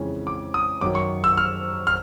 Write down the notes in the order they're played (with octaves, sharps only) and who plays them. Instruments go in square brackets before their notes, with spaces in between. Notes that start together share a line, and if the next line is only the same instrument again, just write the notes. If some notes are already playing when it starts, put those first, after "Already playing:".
Already playing: [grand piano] F2 C#3 E3 G#3 C#4
D6
D#6
F#2 D#3 F#3 D6
C#6
E6
F6
F6